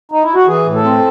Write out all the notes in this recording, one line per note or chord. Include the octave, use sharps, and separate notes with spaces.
D#4
E4
F#4
E3 G#4
A2
A4
C4